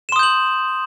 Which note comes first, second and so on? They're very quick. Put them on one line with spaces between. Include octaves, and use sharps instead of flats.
E7 C6 D#6 G6 F#7